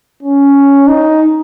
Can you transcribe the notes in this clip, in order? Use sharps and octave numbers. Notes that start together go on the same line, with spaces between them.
C#4
D#4